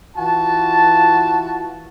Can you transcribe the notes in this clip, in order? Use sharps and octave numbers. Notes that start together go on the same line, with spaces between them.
E3 F4 F#4 A5